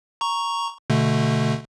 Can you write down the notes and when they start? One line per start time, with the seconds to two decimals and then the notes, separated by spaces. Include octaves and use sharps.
0.21 A#5 C#6
0.90 B2 D3 A3